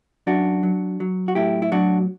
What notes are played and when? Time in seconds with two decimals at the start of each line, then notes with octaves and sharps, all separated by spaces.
0.27 F#2 D4 F#4
0.63 F#3
1.00 F#3
1.28 F#4
1.35 A2 E4 G4
1.62 E4
1.72 F#3 D4 F#4